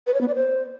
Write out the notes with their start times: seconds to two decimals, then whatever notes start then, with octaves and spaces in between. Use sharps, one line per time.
0.07 B4
0.14 C#5
0.21 B3
0.28 D5
0.35 C5